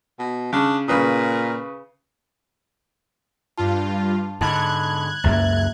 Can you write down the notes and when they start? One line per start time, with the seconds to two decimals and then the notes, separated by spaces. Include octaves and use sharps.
0.19 B2
0.53 C#3 D4
0.88 A#2 C#3 B4 D#6
3.58 G2 F4 A5
4.41 G#2 D3 A5 B5 F#6 G#6
5.24 C#2 F#2 A#3 E5 A6